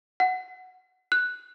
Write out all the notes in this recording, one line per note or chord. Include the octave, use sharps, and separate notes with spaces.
F#5
F#6